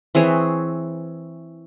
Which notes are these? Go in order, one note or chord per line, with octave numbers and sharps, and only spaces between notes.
E3 C4 G#4 C#5